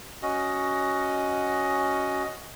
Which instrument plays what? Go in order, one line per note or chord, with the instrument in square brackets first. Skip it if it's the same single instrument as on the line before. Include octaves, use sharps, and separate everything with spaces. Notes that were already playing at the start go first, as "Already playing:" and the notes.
[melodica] C#4 F#4 D#5